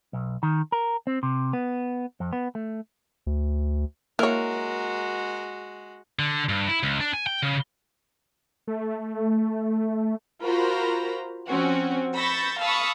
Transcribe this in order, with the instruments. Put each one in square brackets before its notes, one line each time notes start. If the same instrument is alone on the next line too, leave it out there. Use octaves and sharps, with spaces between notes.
[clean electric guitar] B1
D#3
A#4
C4
C3
B3
F2
B3
A3
[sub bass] D2
[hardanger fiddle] G#3 F#4 [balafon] A#3 [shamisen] E4 C#5 [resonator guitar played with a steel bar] A#4
[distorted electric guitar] D3
G2
E4
C#2
D4
G#5
G5
C#3
[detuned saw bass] A3
[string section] F4 F#4 A#4 C5 A#5 B5
F3 C4 C#4 F#4
B5 C#6 E6 G6 A6 A#6
F5 A5 B5 C#6 D#6 E6